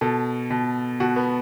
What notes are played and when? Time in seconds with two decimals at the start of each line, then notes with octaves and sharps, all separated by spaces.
0.01 B2 A4
0.50 B2
1.00 B2 F#4
1.16 B3